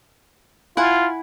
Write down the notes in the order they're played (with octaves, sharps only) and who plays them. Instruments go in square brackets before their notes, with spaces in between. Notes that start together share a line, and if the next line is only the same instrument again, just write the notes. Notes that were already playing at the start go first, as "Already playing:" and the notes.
[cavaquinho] E4 F#5 G#5 [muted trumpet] F4